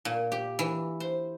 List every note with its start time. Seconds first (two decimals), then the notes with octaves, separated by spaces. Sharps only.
0.05 A#2
0.32 G4
0.59 E3
1.00 C5